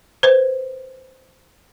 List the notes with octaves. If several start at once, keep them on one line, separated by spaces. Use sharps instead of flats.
B4 C5